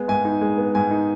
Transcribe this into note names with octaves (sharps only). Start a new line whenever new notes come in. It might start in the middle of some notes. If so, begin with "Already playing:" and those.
Already playing: G#3 B3
G#2 G#5
D#4
G#3
B3
G#2 G#5
D#4